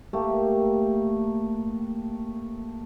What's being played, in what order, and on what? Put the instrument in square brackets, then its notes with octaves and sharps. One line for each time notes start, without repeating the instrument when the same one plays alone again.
[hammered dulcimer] A3 A#3 G4 A#4